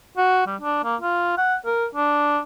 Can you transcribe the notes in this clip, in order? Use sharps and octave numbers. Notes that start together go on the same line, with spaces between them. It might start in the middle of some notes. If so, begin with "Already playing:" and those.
F#4
G3
D4
A#3
F4
F#5
A#4
D4